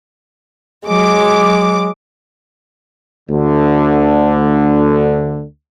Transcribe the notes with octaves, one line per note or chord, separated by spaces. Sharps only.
F#3 G#3 D6
D2 D3